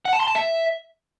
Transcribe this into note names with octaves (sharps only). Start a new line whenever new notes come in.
F#5
A5
C6
A5
E5